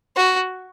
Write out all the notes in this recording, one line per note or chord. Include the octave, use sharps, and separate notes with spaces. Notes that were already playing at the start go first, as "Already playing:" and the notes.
F#4